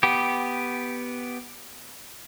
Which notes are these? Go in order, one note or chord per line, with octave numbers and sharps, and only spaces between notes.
B3 G4